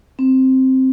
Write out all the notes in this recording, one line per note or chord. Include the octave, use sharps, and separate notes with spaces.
C4